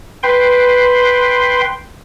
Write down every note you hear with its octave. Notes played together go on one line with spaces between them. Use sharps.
B4 G5 C6